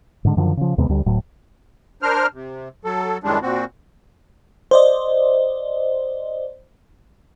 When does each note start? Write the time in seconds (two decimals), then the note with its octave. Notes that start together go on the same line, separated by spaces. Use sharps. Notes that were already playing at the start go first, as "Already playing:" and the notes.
0.25 G#2 D3 G#3
0.37 F#2 D3 D#3 F3
0.57 C#3 F3
0.78 D#2 C3 G#3 B3
0.89 D2 D3 G3
1.06 D1 A2 F#3
2.02 D4 A#4 C5 F6
2.34 C3
2.84 F#3 A4
3.24 F#2 A2 D#3 G3 G#3 D4
3.42 A#2 C4 F#4
4.71 C5 D5 D#5